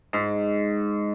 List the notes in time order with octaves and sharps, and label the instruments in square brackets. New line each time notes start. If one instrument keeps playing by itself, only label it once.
[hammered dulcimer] G#2